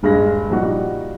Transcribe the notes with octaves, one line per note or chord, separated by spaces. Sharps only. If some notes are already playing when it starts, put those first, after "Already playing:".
D#1 G2 G#3 D#5 A#6
A#2 F3 G3 D#4 F#4